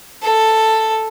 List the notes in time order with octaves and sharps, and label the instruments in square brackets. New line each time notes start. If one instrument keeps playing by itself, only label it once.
[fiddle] A4